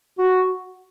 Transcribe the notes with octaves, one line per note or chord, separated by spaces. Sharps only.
F#4